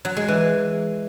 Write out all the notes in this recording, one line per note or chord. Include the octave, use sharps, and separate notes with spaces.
F#3
G#3
E3